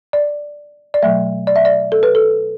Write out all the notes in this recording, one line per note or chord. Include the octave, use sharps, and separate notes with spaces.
D5
D5
B2 F#3 A3 E5
D5
E5
D5
A4
B4
A4